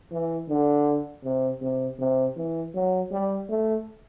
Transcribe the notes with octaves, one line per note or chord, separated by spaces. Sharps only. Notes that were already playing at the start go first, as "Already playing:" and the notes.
E3
D3
C3
C3
C3
E3
F#3
G3
A3